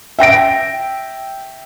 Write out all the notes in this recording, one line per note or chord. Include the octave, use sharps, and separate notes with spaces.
E5 G5 A#6 D7